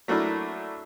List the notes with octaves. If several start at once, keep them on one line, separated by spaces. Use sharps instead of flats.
F#3 A3 A#3 D4 E4